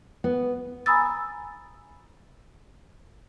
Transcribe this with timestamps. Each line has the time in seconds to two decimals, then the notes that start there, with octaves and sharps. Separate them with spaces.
0.24 B3
0.86 G#5 A#5 B5 D#6 E6 A6